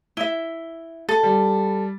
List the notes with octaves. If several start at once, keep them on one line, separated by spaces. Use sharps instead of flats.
E4 E5 G7
A4 A6
G3